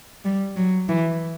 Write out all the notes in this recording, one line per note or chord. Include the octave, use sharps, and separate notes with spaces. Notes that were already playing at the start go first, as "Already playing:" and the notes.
G3
F#3
E3